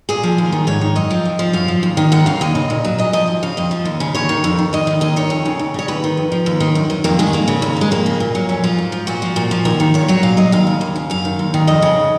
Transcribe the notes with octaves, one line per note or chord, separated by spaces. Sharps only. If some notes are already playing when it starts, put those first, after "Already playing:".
A#2 G#4
F3
D#2
D#3
G#2 C#5
D#3
F#2 D#5
F3
F2
F3
F#2 F5
F3
D#2
D#3
D#2 F#5
C#3 F5
D#2 D#5
C#3
A#2
F#3
A#2 D#5
F3 D#5
D#2
C#3 F5
F2 D#5
F3
D#2
C#3
D#2 C#5
D#3
F2
D#3
D#2 D#5
D#3
D#2 D#5
D#3 C#5
F2
C#3
D#2
C#3 C#5
D#2 B4
D#3
F2
F3
D#2
D#3
F#2
D#3
F2 A#3
D#3 G#3
F2 A#3
C#3
D#2
C#3 G#3
F2 A#3
C#3
A#2
F#3
F2 C#4
F3 F4
G#2
F3
A#2 F#4
F3
A#2
F3
D#2 A#4
D#3
A#2 C#5
F#3 C#5
A#2 F5
F#3 D#5
D#2 F5
C#3
D#2
C#3
F#2 F5
D#3
D#2
D#3
F2 D#5
C#3